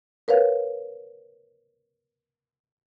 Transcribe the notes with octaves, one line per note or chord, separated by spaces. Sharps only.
A#4 B4 C#5 F5